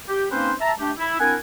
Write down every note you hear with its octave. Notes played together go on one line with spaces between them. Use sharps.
G4
A#3 C4 C#4 D#4 B4 C5
E5 A5 A#5
A3 D4 G4
E4
C4 D4 E4 A#4 F#5 G#5